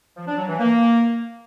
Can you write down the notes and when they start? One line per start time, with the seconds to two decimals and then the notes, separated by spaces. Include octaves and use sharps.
0.17 F3
0.27 D4
0.38 F#3
0.48 E3
0.59 A#3